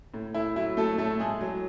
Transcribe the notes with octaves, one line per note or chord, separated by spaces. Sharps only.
A2
A2 E4
F#3 E4
F#3 A3 A4
A2 A3 A4
A2 G#3 G#4
F#3